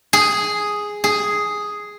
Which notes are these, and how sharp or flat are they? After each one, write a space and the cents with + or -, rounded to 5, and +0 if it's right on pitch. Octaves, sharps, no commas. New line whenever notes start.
G#4 +0
G#4 +0